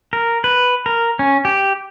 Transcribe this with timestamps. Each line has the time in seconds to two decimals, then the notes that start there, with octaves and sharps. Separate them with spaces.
0.13 A#4
0.44 B4
0.86 A#4
1.19 C#4
1.45 G4